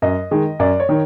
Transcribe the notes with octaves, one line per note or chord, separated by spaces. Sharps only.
F#2 D#5
D#3 G#3
F#2 D5
C#5
D#3